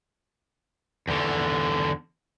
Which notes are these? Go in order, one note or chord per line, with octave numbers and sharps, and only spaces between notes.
E2 D3